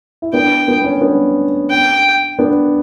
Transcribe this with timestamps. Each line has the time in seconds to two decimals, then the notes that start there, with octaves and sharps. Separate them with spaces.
0.22 E4
0.33 B3 D4 G5
0.68 B3
0.84 C#4
1.01 B3 D4
1.70 G5
2.39 B3 D4